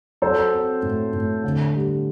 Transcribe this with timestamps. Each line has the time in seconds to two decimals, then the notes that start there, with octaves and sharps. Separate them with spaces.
0.22 F#3 A4 C5
0.52 C4
0.83 A2
1.13 A2
1.44 D3
1.75 G3